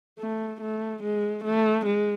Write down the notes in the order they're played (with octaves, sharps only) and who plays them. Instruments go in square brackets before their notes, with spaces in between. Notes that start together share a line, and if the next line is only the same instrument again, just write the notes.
[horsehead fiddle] A3
A3
G#3
A3
G#3